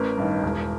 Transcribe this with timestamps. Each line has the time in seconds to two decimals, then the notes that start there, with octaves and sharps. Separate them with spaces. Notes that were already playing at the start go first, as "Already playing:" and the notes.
Already playing: A1 A#4
0.17 G2 D#3
0.43 E1